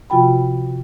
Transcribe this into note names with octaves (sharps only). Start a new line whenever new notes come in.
C3 F3 F4 F#4 G5 B5